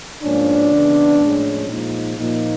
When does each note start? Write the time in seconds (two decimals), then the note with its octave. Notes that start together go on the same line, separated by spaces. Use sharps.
0.22 G#2 F3 A#3 C#4 D4
0.72 C#3 E3 G#3 B3
1.20 A2 F3 G#3 C#4
1.68 A#2 F3 G#3 D#4
2.17 A#2 F3 A#3 D#4